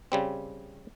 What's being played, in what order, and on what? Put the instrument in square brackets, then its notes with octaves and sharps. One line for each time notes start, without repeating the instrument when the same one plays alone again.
[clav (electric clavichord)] C#3 G3 C4